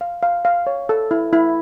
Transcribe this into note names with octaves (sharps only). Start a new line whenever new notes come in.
F5
F5
F5
C#5
A4
E4
E4